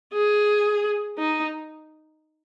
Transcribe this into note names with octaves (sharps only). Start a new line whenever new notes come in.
G#4
D#4